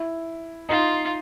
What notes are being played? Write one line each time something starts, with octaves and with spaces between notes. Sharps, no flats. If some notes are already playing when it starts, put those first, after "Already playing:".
Already playing: E4
D#4 F4